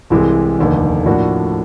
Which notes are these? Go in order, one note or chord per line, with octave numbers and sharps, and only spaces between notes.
C2 C3 E3 G#3
F1 D#2 D3
A2 F3 A#3 D4 F#4